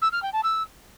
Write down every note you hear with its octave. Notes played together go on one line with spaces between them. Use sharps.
E6
F6
G5
A5
E6